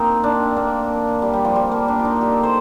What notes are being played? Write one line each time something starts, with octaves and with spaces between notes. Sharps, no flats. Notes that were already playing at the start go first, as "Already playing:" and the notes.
Already playing: A#3 C4 D#4
D4
A#3
G3
G3
F3
G3
A#3
D4
F4
D#4
G4
A4
C5